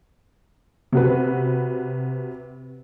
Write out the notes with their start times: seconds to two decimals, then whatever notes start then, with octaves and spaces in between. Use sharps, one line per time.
0.92 C3 F#4 B4